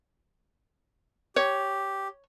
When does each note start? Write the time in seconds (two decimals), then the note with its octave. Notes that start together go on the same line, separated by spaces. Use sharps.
1.36 G4 C#5